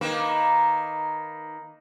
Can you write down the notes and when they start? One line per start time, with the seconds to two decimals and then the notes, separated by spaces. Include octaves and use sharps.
0.01 D#3 A#3 B4